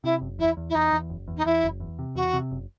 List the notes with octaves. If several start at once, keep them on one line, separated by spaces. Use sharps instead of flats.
C3 E4
F#1
E2 E4
E2
E4
E2 D#4
E2
F#1
E2
D#4
E2 E4
F#1
E2
C3
E2 F#4
C3
F#1